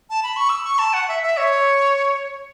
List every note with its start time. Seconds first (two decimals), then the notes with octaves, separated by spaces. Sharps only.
0.10 A5
0.23 B5
0.37 C#6
0.49 E6
0.64 C#6
0.79 A5
0.93 F#5
1.08 E5
1.23 E5
1.37 C#5